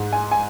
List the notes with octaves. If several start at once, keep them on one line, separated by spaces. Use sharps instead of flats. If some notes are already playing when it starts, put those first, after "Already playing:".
Already playing: G#2 G#3
G#5
G#5